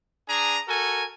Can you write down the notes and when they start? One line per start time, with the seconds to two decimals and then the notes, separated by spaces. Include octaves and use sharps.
0.28 D4 G#4 G#5 A#5
0.68 F#4 A4 A#4 G#5